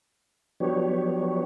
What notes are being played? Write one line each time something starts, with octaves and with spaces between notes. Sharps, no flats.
F3 F#3 B3 D4 G4 C#5